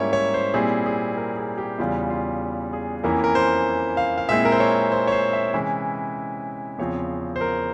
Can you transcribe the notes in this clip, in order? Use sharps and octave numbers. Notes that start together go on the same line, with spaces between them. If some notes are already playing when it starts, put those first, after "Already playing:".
Already playing: G#2 G3 A#3 C#4 E4 C#5 E5
C#5
C5
A#2 G3 C4 E4 G#4
G#4
A#4
G#4
G4
E2 C#3 E3 G3 F4
F4
G#4
F2 E3 A#3 C#4 E4 A#4
A#4
C5
F5
F5
A#2 G#3 C4 E4 E5
A#4
C5
C#5
C5
C#5
C5
E5
C3 E3 G#3 C#4 E4
E2 C#3 F3 C4 C#5
C5
A#4